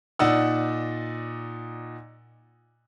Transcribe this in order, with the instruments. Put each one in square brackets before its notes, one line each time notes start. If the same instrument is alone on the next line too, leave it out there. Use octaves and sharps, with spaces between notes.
[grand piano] A#2 D#4 D5 F#5 E6